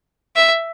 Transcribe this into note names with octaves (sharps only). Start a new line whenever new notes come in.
E5